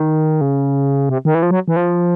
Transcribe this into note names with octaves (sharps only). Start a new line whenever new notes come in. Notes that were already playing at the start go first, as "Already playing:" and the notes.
Already playing: D#3
C#3
C3
D#3
E3
F3
F#3
E3
F3